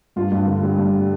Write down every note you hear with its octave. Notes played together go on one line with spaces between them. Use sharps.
G2 F4
G2
D3
G3
G2